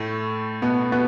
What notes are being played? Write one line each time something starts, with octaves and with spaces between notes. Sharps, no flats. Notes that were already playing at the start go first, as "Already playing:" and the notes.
Already playing: A2 A3
B2 B3
B2 B3